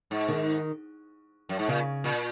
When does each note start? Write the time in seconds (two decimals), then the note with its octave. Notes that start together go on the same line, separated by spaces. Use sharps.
0.11 G#2
0.29 D#3
1.49 F#2
1.59 G#2
1.68 A#2 C#3
2.04 A#2